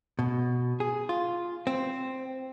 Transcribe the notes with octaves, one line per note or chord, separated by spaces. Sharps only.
B2
G#4
F4
C4